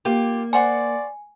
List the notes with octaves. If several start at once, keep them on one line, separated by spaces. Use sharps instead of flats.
A#3 F4 G4
C5 D5 F#5 G#5 C#6